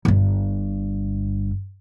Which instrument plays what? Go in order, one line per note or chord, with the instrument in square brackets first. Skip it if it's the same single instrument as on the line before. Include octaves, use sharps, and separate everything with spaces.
[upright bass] G1 G2